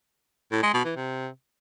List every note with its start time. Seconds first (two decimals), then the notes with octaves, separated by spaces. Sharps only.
0.51 A2
0.63 G#3
0.74 B2
0.85 E3
0.96 C3